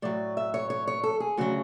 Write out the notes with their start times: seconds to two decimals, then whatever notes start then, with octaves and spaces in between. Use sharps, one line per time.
0.02 A2 F#3 D5
0.37 E5
0.54 C#5
0.70 C#5
0.87 C#5
1.03 A4
1.20 G#4
1.37 D2 C#3 F#3 F#4